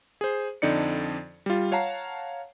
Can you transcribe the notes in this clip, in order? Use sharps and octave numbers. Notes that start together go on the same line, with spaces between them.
G#4 C5
F2 D3 D#4 D5 C#7
G3 F4
C#5 F5 F#5 A5 A#5 C7